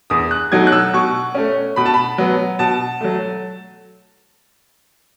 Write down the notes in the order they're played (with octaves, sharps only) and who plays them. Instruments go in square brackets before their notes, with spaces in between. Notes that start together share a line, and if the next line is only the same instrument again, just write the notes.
[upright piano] E2 D#6
F#6
B2 F#3 A3 D#4 G#6
F#6
E6
B2 C#6
A3 C#4
B2 B5
A5
B5
F#3 B3
B2 A5
F#3 A3